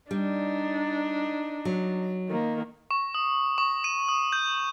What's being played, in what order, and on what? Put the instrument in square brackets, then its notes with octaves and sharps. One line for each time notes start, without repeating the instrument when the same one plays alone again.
[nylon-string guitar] G3 [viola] D4 D#4
[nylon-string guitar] F#3
[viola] D#3 A#3
[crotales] C#6
D#6
C#6
D#7
D#6
G6